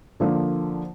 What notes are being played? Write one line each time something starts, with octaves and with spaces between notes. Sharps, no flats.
D3 F3 A#3 D4